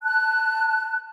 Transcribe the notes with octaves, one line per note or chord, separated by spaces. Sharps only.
A5 F#6